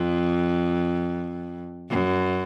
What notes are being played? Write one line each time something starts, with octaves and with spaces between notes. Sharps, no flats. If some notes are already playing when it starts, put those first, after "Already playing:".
Already playing: F2
F#2